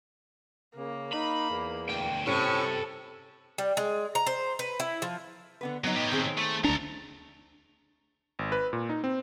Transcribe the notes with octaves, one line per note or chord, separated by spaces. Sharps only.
C#3 A#3
D#4 B5
E2
D2 G5
A2 C3 C#4 A4 G5 C#6
G3
G#3
A#5
C5
B4
E4
F3
D3 B3 B4
F#3 B3 D#4
A2 G4
D#3 C4 G#4
A3
D2 D4 A4 A#5
G#1
B4
A#2
D#4
C4